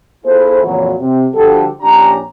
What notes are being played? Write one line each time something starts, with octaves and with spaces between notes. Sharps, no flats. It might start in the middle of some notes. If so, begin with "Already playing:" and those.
B3 E4 F4 G#4 A4 C5
F2 A#2 C#3 E3 F#3
C3
D3 F3 G3 F#4 G4 A4
A#1 C#4 D4 G4 A#5